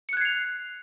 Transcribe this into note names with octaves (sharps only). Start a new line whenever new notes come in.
F#6 G#6 C7 C#7 F7